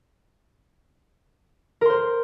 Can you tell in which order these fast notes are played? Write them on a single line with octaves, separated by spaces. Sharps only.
A#4 C6 C5